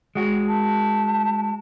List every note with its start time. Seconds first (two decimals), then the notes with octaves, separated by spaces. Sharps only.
0.15 G#3 F#4
0.48 A5